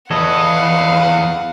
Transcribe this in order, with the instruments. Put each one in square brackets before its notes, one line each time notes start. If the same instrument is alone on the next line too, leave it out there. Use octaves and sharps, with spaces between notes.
[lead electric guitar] E2 B4 [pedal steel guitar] A4 C#5 D#5 [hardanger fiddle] F5 F#5